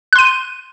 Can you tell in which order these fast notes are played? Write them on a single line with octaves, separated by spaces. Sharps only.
F#6 C6 D#7